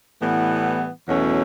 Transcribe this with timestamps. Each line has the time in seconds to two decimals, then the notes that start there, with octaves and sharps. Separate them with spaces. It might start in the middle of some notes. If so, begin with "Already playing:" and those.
0.21 A2 E3 G3 B3
1.08 E2 B2 F#3 A3 C#4